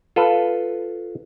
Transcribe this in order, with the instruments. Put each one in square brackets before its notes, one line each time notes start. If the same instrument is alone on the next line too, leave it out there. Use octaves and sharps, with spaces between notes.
[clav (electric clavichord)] F4 A4 B4